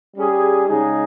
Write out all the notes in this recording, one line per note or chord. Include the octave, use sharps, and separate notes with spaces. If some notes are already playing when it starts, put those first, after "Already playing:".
G3 C#4 G#4
C#3 G#3 D#4 G#4